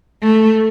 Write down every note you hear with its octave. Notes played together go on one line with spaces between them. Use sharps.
A3